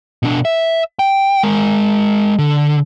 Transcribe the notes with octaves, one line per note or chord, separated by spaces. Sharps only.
B2 D4
E5
G5
G#3 A#4
D3